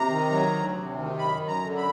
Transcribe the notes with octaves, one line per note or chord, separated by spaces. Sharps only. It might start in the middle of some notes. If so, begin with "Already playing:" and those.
Already playing: C3 A#5
D#3
F#3
D2
C3
D#3
F#2 B5
F#2
A#5
D3
B5